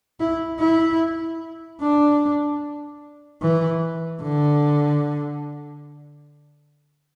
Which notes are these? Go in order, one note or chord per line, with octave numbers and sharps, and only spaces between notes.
E4
E4
D4
E3
D3